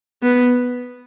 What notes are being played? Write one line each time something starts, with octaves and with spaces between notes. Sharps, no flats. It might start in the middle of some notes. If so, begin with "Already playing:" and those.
B3